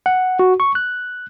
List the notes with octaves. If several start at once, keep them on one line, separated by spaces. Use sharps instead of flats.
F#5
F#4
C#6
F#6